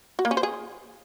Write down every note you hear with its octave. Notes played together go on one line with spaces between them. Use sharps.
F#4
A#3
C#4
C5
G#4